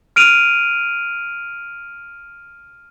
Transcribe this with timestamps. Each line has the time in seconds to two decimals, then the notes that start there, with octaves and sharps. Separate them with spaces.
0.16 F6 D7 D#7 F7